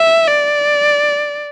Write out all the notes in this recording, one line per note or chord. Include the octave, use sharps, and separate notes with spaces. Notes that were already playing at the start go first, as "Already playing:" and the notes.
Already playing: E5
D5